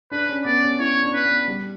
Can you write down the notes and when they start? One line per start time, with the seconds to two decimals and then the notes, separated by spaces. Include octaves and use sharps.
0.11 D4 B4
0.29 C#4
0.45 B3 D5
0.63 C#4
0.79 E4 C#5
1.02 D4
1.14 B4
1.25 B3
1.48 G3